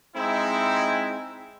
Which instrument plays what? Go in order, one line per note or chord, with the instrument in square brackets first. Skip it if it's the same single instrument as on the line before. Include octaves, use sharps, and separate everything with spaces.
[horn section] G#3 C4 D#4 E4